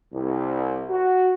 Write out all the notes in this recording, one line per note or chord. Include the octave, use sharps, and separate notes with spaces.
C2
F#4